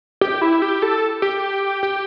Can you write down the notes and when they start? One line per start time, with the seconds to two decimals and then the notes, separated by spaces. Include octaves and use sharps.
0.21 G4
0.42 E4
0.62 G4
0.82 A4
1.22 G4
1.83 G4